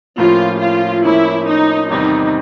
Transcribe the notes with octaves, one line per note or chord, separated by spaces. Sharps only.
A2 F3 A#3 C#4 F4
F4
A2 F3 A#3 C#4 E4
D#4
E2 C3 D#3 G3 C4 D#4